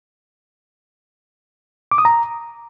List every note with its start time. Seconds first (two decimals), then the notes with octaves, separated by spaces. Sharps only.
1.92 D6
1.98 D#6
2.05 A#5